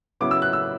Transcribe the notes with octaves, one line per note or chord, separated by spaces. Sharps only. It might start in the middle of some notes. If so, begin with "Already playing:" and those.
C#3 F#3 B3 E4 D6
E6
F#6
E6